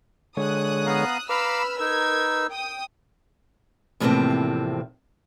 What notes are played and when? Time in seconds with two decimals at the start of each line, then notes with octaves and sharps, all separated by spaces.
0.37 D3 G#3 C#5 D#6 F#6
0.86 B3 F5 A#5
1.29 B4 F5 A#5 B5 D6 E6 F6
1.80 D#4 A#4 E6 G#6
2.51 G5 D#6
4.00 E2 A2 C3 F3 A#3 C4